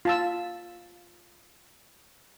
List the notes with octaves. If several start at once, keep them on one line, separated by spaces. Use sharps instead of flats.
F4 A5 E6